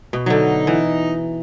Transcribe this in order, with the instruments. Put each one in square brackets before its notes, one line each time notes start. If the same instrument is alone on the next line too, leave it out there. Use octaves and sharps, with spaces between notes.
[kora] B2
[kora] D3 F#3 [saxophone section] D#4
[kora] E3